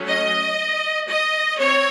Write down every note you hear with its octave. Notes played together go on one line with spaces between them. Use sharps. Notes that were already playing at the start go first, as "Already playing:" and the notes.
Already playing: F#3 A3 C#4
D#5
D#5
C4 C#5